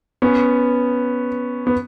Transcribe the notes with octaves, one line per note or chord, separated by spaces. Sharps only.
B3 C#4
B3